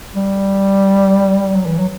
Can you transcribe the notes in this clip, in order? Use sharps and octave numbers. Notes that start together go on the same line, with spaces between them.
G3
F#3
E3
F#3